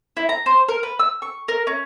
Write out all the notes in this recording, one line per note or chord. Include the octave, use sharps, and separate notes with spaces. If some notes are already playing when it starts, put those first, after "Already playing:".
E4
A#5
C5
A#4
B4
E6
C#6
A#4
C#4